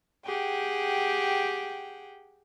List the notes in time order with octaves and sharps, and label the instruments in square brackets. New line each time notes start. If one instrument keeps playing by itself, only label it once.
[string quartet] G4 G#4 F#5 G5